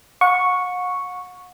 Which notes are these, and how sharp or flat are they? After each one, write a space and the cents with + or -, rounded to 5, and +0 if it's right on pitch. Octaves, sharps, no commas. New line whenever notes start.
F#5 -40 C#6 +0